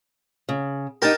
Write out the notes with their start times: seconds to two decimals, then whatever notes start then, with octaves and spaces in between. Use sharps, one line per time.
0.49 C#3
1.02 D#4 G4 A#4 G5 A5